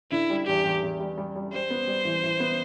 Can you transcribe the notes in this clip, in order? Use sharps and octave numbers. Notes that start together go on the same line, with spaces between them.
D3 E4
G3
E2 G4
E2
E2
G3
G3
G3
G3 C5
B3
G3
E3
E3
B3